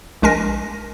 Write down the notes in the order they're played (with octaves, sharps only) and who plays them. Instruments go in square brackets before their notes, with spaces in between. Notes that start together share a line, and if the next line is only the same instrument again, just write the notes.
[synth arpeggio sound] A#1 G#3 A#4 G#5 A#6